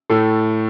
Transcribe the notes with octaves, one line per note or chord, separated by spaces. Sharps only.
A2 A3